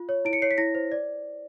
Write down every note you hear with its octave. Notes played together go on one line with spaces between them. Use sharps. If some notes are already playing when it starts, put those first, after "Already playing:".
Already playing: F4
C#5
E4 D7
C#7
C#5 C7
B6
E4 A#6
C5
D5